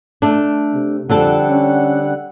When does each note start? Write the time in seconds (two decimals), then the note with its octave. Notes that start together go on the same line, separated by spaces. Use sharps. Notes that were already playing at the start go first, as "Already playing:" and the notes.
0.22 A3 D4
0.74 C3
1.10 F2 D3 G3 C4 A4 F#5
1.50 C#4